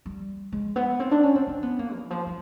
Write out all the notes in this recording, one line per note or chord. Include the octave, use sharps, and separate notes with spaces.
G3
G#3
B3
C4
D4
C#4
C4
C4
B3
A#3
E3
F3
G3